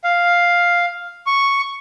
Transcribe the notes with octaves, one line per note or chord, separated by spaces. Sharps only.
F5
C#6